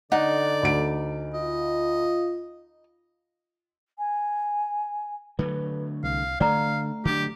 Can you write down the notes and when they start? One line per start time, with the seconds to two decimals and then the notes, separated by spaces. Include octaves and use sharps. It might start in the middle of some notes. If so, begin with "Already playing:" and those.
0.12 D3 D#4 D5 F#5
0.63 D2 D7
1.33 F4 D#5
3.98 G#5
5.39 D3 F#3 A3 B4
6.04 C2 F5
6.40 D3 A3 D5 F5 F#5 A#5
7.05 D3 F#3 D4 G4